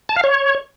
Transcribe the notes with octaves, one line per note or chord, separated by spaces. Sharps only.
A5
F5
C#5